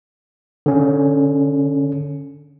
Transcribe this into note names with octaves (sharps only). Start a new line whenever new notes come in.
D3 C#4